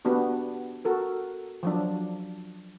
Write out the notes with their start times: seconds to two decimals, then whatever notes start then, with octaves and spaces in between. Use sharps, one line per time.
0.05 B3 D4 F#4 G4
0.85 F#4 A4 A#4
1.63 F3 F#3 D4